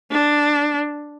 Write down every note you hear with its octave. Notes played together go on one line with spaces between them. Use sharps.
D4